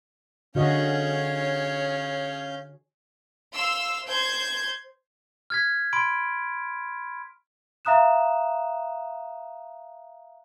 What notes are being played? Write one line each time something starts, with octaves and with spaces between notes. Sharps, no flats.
D3 C#4 F#4 G#4 C#5 D#5 F5 G6
F5 C6 E6
C5 G6 G#6
F6 G#6 B6
B5 C6 G#6 D7
E5 F5 A#5 D#6 F#6 E7